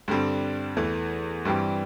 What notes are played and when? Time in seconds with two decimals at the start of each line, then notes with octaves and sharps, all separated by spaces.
0.08 G2 D3 G3 C4
0.77 E2 E3 A3
1.45 G2 E3 G3 C4 G4